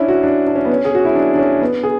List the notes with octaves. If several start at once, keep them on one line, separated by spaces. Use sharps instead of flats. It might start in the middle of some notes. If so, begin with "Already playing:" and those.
Already playing: C#4 D4 E4
F#4
D4
D4
C#4
B3
C#4
G#4
F#4
E4
D4
D4
C#4
B3
G#4